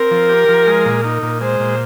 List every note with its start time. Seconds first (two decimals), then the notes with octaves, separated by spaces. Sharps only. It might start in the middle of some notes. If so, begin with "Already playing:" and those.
Already playing: C4 A#4
0.11 F3
0.29 G4
0.48 F3
0.67 G#3
0.86 A#2
1.04 D#4
1.22 A#2
1.41 G#3 C5
1.60 A#2